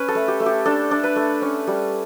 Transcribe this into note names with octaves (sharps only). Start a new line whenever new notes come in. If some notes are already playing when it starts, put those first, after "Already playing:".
Already playing: C#4 B4
A4
A3
G4
A3
G4
D4 A4
D4
B4
A3
C#4
G3